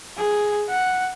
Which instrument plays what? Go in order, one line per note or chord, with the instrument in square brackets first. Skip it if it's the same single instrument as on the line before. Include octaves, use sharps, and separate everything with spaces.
[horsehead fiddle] G#4
F#5